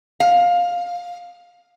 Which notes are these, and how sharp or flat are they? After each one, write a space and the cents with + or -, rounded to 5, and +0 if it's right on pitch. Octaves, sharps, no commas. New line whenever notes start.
F5 +15